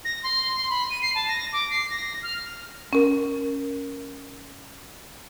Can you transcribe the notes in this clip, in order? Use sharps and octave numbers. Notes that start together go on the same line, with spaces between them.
A#6
C6
C6
B5
D#7
C7
A5
A#6
D6
C7
A#6
F6
C#4 A#4